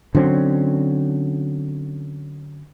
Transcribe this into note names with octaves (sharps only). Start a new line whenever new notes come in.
D3 F#3 C4 C#4